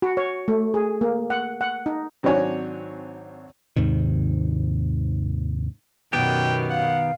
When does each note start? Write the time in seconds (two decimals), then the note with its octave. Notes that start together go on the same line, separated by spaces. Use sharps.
0.02 F#4
0.17 C#5
0.48 A3
0.74 G#4
1.01 A#3
1.30 F#5
1.61 F#5
1.86 D#4
2.23 G#1 F#3 C4 D4 C#5 G#5
3.76 D#2 G#2 C3 D#3
6.13 F#2 B2 D#3 B3 G4 G5
6.70 F5 F#5